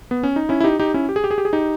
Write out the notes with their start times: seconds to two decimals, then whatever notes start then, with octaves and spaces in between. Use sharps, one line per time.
0.11 B3
0.23 C#4
0.36 D#4
0.49 C#4 E4
0.61 E4
0.64 D#4 G4
0.79 D#4 G4
0.94 C#4 E4
1.09 G4
1.16 G#4
1.24 G4
1.31 G#4
1.38 G4
1.45 G#4
1.53 D#4 G4